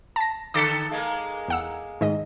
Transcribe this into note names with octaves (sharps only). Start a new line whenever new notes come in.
A5 A#6
D3 A4 D6 A6 B6
G#3 A#3
E2 F#5 E6
G#2 D#3 D#5